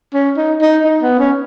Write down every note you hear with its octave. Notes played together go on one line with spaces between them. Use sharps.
C#4
D#4
D#4
D#4
B3
C#4